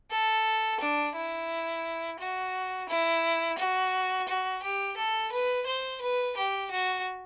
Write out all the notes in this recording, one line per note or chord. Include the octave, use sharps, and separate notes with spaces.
A4
D4
E4
F#4
E4
F#4
F#4
G4
A4
B4
C5
B4
G4
F#4